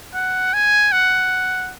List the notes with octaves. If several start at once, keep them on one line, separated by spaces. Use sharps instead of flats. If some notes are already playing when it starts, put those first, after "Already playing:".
F#5
G#5
F#5